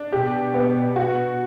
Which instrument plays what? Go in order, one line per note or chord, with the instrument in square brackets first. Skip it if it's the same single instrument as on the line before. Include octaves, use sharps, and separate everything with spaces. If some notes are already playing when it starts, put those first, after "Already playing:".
Already playing: [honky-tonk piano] D4
[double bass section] B2 [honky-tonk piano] G4
[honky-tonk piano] B3
F#4